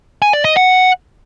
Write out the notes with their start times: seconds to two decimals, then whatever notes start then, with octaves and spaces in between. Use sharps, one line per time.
0.22 G#5
0.33 D5
0.45 D#5
0.56 F#5